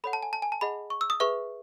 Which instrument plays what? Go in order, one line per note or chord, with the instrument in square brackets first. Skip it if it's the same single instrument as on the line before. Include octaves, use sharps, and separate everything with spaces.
[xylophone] A4 C#5 F#5 B5
A5
G#5
A5
G#5
A5
G#4 D#5 F#5 B5
C#6
E6
D#6
G#4 B4 E5 C#6